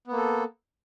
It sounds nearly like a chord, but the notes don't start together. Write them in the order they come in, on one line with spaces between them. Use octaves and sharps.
B3 A#3 A4